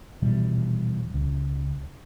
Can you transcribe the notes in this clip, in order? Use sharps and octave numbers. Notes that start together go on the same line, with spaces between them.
D#1 B2 E3 G3
C#2